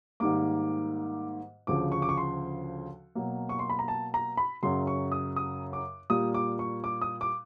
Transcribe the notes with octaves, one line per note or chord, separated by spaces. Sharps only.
G#2 D#3 G3 A#3 D6
D2 C#3 F3 D6
C#6
D6
C#6
C6
B2 F#3 A#3
C#6
C6
B5
A#5
A5
A#5
B5
F#2 C#3 F#3 C6
C#6
D#6
D#6
D6
A#2 G3 A#3 D#6
D6
C#6
D6
D#6
D6